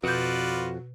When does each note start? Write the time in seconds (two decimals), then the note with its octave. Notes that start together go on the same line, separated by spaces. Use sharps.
0.04 F2 B2 F4 F#4 B4 D5 G6